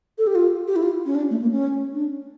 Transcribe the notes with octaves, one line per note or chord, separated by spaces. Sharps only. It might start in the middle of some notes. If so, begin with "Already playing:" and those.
A4
G4
F4
G4
E4
F4
C#4
D4
A3
A#3
C#4
D4